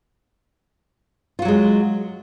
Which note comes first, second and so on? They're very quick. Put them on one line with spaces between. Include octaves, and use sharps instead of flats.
F4 F#4 F#3 G#3